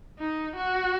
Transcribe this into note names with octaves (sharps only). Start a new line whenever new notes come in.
D#4
F#4